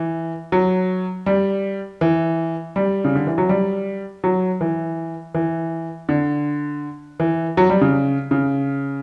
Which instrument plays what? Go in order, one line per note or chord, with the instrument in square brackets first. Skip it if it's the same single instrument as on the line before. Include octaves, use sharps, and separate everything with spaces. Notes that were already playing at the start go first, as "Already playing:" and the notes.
Already playing: [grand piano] E3
F#3
G3
E3
G3
C#3
D3
E3
F#3
G3
F#3
E3
E3
D3
E3
F#3
G3
C#3
C#3